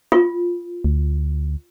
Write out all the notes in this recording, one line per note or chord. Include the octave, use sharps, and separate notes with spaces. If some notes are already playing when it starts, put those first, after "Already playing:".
F4
D2